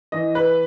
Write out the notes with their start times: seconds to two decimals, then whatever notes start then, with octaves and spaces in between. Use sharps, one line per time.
0.12 E3 D#5
0.35 B4